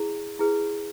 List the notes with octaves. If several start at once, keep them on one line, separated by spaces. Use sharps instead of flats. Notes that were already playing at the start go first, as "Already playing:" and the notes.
Already playing: E4 G#4
E4 G#4 B4